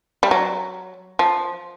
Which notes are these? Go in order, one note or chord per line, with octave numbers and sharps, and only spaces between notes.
G3
F#3
F3